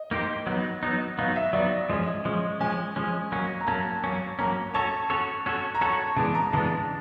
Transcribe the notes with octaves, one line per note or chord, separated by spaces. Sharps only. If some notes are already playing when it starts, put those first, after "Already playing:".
Already playing: D#5
A#3 D#4 G4 C5
F#3 B3 D#4
F#3 B3 D#4
F#3 B3 D#4 F5
E5
F#3 B3 D#4 D5
F3 G#3 C#4 D#5
F3 G#3 C#4
F3 G#3 C#4 G#5
F3 G#3 C#4
F#3 A#3 C#4
A#5
F#3 A#3 C#4 A5
F#3 A#3 C#4
F#3 A#3 C#4 A#5
C#4 F#4 A4 C#5 A5
C#4 F#4 A4 C#5
C#4 F#4 A4 C#5
A#5
C#4 F#4 A4 C#5 A5
C#3 E3 G#3 B3 D4 A5
A#5
C#3 E3 G#3 B3 D4 A5